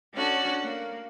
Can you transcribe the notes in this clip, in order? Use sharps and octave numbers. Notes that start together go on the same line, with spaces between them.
C#4 D4 F#4 A4
A#3